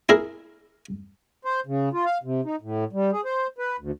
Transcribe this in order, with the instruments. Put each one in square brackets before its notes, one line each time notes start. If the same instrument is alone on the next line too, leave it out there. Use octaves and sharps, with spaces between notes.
[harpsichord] E4 G#4 A#4
[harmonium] C5
C#3
F4
F5
C3
D#4
A2
G3
G#4
C5
B4
D2